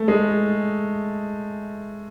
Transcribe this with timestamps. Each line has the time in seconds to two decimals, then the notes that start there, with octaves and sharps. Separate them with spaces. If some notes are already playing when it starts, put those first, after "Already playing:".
Already playing: A3
0.08 G#3